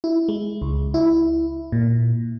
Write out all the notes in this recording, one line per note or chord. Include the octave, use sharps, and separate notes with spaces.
E4
G#3
C#2
E4
A#2